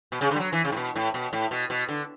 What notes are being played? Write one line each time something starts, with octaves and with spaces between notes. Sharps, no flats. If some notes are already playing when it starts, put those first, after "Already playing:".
B2
C#3
D3
G3
F#3
E3
C#3
A2
B2
A2
B2
A2
B2
B2
D3